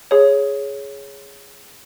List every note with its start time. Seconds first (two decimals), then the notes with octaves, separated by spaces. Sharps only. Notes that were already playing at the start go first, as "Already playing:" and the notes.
0.11 G#4 C#5